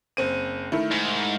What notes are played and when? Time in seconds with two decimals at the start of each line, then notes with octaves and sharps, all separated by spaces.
0.17 F#1 C4 D#7
0.72 D#3 A3 E4
0.91 G#2